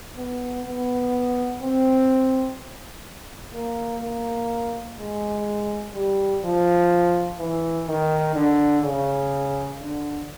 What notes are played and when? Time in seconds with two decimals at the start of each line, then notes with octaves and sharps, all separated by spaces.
0.17 B3
0.65 B3
1.62 C4
3.54 A#3
4.02 A#3
4.99 G#3
5.95 G3
6.43 F3
7.39 E3
7.87 D#3
8.35 D3
8.84 C#3
9.79 D3